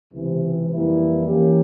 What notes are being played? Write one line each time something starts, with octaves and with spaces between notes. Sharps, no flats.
C#2 C3 E3
F2 E3 G3 A#3 E4
E3 A#3 C#4 G4